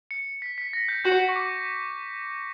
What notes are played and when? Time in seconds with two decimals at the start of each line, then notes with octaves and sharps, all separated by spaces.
0.11 C#7
0.42 B6
0.58 B6
0.73 A#6
0.89 G6
1.04 F#4 G6
1.20 G6
1.29 C#6
1.36 D6